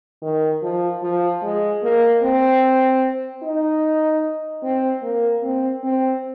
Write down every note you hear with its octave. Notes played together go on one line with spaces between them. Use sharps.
D#3
F3
F3
G#3
A#3
C4
D#4
C4
A#3
C4
C4